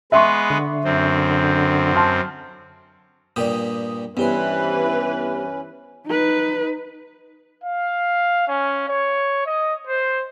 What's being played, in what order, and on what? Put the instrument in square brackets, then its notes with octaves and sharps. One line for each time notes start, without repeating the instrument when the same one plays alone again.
[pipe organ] G#3 B3 B4 [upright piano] E5 C6 C#6
[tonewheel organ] D3
[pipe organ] F#2 C4
[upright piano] A5 C6 F6
[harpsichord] G2 A#2 G4 [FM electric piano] D5 D#6
[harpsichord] G2 [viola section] E3 B4 [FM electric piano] B3 G4 C5 [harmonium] C#4
[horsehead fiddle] D#4 B4
[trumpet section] F5
C#4
C#5
D#5
C5